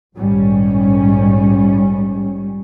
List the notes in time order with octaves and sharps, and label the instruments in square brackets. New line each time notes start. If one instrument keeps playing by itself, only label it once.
[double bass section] A#1 G#2 D#3 G3 C#4